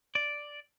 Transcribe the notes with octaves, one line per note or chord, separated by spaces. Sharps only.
D5